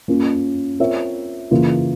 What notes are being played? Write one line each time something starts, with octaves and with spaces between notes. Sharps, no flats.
A#3 C#4 F4
C4 F4 A#4 C#5 E5
C#3 E3 A#3 F4